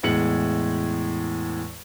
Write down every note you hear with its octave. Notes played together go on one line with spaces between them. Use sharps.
E2 A2 G#3 C#7 F#7